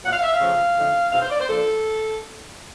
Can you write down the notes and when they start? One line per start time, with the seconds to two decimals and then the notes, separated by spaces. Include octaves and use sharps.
0.04 A#2 F#3 A#3 F#5
0.13 F5
0.23 E5
0.33 F5
0.40 C#3 F3 A3
0.76 D3 F3 A3 C4 D#4
1.12 B2 G#3 C4 D#4 F5
1.21 C5
1.30 D5
1.40 C5
1.48 F3 A#3 D4 A4